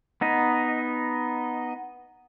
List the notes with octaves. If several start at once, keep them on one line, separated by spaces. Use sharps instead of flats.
B3 D#4 D#5